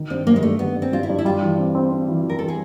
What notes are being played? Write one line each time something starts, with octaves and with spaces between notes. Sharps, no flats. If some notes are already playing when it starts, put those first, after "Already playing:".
Already playing: D#3
G2 C4
G2 A#3
G#3
G2 A3
G2 B3
G2
C4
G2 F4
E4
G2
E4
G3 F4
E3
C4
C4
C4
E3
E3
A#4
G3 A4
G#4